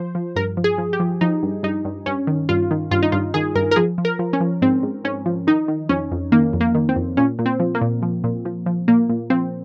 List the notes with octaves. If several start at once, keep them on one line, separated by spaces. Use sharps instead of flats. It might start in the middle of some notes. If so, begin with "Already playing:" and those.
Already playing: F3 C5
F3
G2 A#4
F3
G#4
F3
G4
F3
F3 D#4
G2
G2 D#4
G2
G2 C#4
D#3
G2 F4
D#3
G2 F4
D#4
G2 F4
D#3 G#4
G2 A#4
A#4
F3 G#4
F3
A#4
F3
C#4
F3
G#2 C4
G#2
G#2 C#4
F3
D#3 D#4
D#3
F2 C#4
F2
D#3 A#3
F2
A#3
D#3
C4
F2
A#2 C#4
A#2
C4
F3
A#3
A#2
F3
A#2
F3
F3
A#2 A#3
A#2
F3 C4